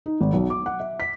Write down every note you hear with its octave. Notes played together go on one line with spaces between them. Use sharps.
D#4
G#1
B1
D6
F#5
E5
B6